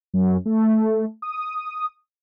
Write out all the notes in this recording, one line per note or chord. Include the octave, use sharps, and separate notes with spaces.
F#2
A3
D#6